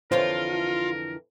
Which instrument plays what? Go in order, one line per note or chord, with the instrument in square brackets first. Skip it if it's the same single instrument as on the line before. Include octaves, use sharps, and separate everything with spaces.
[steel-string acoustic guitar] F2 D3 E3 [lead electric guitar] F4 [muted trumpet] A#4 [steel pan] C5 C#5